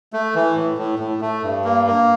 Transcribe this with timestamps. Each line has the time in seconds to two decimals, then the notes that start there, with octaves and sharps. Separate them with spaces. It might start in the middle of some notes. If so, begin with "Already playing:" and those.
0.13 A3
0.35 E3
0.56 A2
0.78 A2
0.99 A2
1.21 A3
1.43 G2
1.65 A#3
1.87 A#3